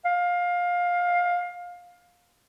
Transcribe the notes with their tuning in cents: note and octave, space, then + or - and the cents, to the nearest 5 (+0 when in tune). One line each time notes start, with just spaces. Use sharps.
F5 +20